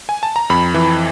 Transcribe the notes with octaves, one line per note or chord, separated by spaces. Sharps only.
G#5
A5
A#5
F2 B5
E3